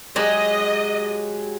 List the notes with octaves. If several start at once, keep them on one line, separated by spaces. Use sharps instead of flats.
F#3 G#3 G4 D#5